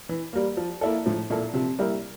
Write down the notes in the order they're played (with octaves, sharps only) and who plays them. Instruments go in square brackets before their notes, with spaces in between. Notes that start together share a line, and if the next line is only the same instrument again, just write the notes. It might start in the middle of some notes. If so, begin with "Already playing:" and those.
[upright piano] E3
G3 A#3
F3
A#3 E4 A4
[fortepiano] A2 [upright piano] F3
[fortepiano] A#2 [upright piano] A#3 E4 A4
[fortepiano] C3 [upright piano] F3
[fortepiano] G3 [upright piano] A#3 E4 A#4